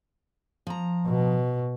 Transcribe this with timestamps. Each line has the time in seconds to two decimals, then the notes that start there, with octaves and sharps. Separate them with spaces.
0.67 F3 A#5
1.06 B2